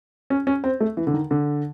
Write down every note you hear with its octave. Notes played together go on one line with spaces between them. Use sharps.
C#4
C#4
C4
A3
E3
D3
D#3
D3